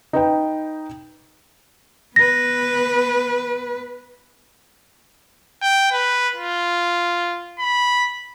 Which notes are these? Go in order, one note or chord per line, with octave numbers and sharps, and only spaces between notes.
D#4 B4 G5
B3 B4 A#6
G5
B4
F4
B5